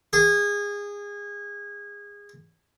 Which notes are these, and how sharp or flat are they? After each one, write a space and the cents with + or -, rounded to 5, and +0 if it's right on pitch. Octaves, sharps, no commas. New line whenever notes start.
G#4 -25